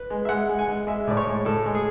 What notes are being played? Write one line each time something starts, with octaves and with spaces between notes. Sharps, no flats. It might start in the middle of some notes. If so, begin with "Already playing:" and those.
Already playing: B4
G#3
E5
G#3 F#5
G#3
G#5
G#3
G#3 E5
A2 D5
C#5
G#3
A2 A4
G#3
G#4